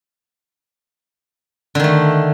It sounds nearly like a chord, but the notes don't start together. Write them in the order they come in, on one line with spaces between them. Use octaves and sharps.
D3 D#3 A3